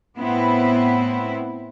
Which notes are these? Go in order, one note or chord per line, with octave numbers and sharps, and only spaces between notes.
A2 B3 C4 E4